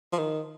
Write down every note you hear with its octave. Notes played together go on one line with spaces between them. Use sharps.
F3
D#3